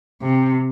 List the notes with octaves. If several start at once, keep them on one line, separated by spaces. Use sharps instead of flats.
C3